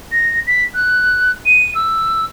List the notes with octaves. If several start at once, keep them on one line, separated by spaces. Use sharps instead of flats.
A#6
B6
F#6
D#7
E6